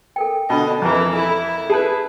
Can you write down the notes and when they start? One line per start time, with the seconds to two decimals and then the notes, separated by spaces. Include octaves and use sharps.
0.16 A4 A#4 G5
0.50 B2 D3 D#5 A5 B5
0.82 F2 E3 A#4 A#5 C#6
1.16 E4 A4
1.70 G#4 A4 B4 A5